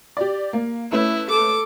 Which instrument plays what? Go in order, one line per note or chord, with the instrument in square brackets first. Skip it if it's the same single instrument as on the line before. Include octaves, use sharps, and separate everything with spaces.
[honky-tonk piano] G4 D5
A#3
[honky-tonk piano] A3 C#4 B4 [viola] E4
[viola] A4 D6